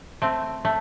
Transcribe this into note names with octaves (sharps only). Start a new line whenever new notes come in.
A3 C4
A3